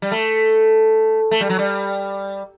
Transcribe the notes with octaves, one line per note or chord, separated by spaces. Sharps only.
G3
A3
A3
G3
F#3
G3